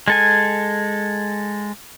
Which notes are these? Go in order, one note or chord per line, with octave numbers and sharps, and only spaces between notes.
G#3 A4 G#5